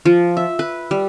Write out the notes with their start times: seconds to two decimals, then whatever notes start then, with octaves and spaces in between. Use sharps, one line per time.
0.05 F3
0.37 E5
0.59 B4
0.91 G3